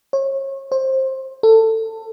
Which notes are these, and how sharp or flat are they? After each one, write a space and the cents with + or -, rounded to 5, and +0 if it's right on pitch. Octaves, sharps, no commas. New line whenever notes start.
C#5 -35
C5 +20
A4 +20